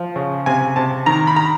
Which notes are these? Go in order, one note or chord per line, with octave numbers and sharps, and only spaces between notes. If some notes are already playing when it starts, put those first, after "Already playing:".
Already playing: F3
C#3
C3 G#5
C3 A5
D#3 A#5
B5
A#5